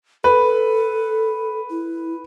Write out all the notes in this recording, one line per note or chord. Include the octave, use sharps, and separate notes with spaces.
A4 B4
E4